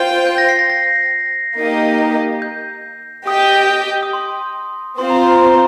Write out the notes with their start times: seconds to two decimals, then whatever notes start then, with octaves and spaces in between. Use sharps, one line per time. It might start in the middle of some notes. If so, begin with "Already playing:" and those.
Already playing: F4 C5 G5
0.27 G6
0.38 A#6
0.49 C7
0.59 A#6
0.70 A#6
1.56 A#3 D#4 G4 D#5
2.42 G6
3.27 G4 D#5 G5 D#6
4.03 D#6
4.13 C6
4.98 C4 F4 C5 C6
5.10 A#5
5.30 A#5